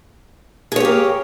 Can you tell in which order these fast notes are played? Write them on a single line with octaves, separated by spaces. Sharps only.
G#4 C#5 G4 A#3